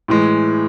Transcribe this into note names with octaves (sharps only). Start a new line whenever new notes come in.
A2 E3 G#3